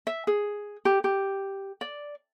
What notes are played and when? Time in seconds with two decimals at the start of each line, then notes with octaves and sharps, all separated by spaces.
0.07 E5
0.27 G#4
0.85 G4
1.04 G4
1.81 D5